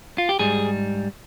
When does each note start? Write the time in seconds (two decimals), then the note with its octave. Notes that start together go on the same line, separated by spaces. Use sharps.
0.18 F4
0.29 G4
0.39 G#2 G3 G#4